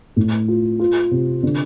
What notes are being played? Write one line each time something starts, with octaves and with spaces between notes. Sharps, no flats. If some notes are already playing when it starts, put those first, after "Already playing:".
A2
F4
F4
C3
D3